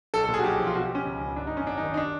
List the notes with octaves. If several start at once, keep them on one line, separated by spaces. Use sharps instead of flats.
B1 A4
A4
A#2
G#4
F#4
B1 G4
F3
F4
B2 F#4
G4
B2
C#4
C#2
C#2
G#1 D4
D#4
F#2
C#4
G#1 D4
D#4
D#3
D#4
D4